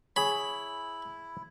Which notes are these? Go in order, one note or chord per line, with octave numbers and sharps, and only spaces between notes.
E4 G#4 C#5 B5